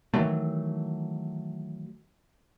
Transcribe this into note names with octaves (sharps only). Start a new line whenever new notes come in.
D#3 E3 F#3 A3